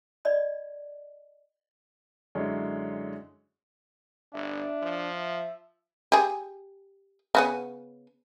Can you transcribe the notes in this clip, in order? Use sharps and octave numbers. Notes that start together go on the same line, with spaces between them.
D5 D#5 B5
F#2 D3 G#3 E4 C#5
G1 D4 E5
F3
G4 G#4
C#3 B3 C#4